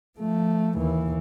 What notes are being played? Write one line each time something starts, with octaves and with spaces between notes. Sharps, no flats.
F3 A3
D#2 E3